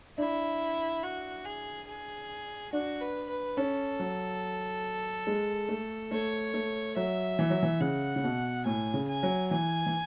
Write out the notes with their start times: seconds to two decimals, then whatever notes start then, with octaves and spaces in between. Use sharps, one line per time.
0.18 D4 E4
1.03 F#4
1.45 G#4
1.88 G#4
2.73 D4 F#4
3.01 B4
3.29 B4
3.57 C#4 A4
3.99 F#3
5.27 G#3
5.69 A3
6.11 A3 C#5
6.54 A3
6.96 F#3 E5
7.39 E3
7.50 F#3
7.63 E3
7.80 C#3 F#5
8.16 C#3
8.24 B2
8.65 A2 G#5
8.94 C#3
9.08 G#5
9.23 F#3
9.50 E3 G#5
9.86 E3